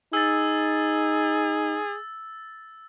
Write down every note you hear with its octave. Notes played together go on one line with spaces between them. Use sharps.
D#4 G#4 E6 A6